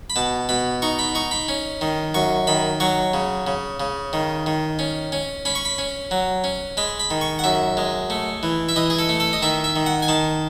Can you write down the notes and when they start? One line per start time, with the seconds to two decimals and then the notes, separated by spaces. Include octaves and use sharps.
0.10 B5
0.16 B2 A5
0.49 B2 B5
0.82 D#4 C#6
0.99 B5
1.15 D#4 C#6
1.31 B5
1.48 C#4
1.81 D#3
2.14 F#2 C#6
2.47 D#3 B5
2.80 F#3 C#6
3.14 C#3
3.47 C#3
3.80 C#3
4.13 D#3
4.46 D#3
4.79 C#4
5.12 C#4
5.45 C#4 B5
5.55 C#6
5.65 B5
5.78 C#4
6.11 F#3
6.44 C#4
6.77 G#3 B5
7.00 B5
7.11 D#3
7.21 C#6
7.39 F#5
7.44 F#2 E5
7.77 G#3
8.10 A3
8.43 E3
8.69 E5
8.76 E3 D#5
8.90 G#4
8.99 A4
9.09 A3
9.20 A4
9.33 D#5
9.42 D#3 E5
9.64 E5
9.76 D#3
9.86 F#5
10.02 G#5
10.08 D#3 A5